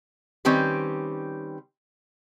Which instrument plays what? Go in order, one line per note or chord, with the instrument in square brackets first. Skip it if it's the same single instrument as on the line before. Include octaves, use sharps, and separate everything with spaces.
[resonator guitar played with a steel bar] D#3 G3 C4 C#4 G4 B4